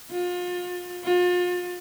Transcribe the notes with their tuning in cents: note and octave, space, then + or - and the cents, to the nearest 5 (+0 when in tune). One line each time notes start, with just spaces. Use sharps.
F4 +35
F4 +35